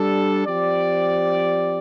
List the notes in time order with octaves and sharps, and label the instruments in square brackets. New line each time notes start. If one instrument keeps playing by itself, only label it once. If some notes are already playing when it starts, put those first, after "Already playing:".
Already playing: [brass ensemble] G3 D4 A4
F3 C4 G4 D5